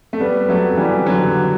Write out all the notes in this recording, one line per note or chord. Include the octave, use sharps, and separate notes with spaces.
A3
G3 B3
F#3 A3
E3 G3
D3 F#3